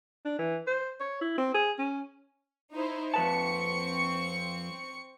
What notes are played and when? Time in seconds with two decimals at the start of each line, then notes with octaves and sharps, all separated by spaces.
0.25 D4
0.39 E3
0.67 C5
1.00 C#5
1.21 E4
1.38 C4
1.54 G#4
1.78 C#4
2.73 D#4 E4 C5
3.14 F2 C4 B4 A5 C#6 C#7